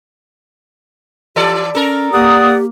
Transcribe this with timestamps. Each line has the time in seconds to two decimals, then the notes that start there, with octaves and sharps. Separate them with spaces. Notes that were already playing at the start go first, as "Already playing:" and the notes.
1.36 E3 G4 A4 D5
1.75 C#4 A4 A#4
2.12 A#3 G4 D5 F#5 D#6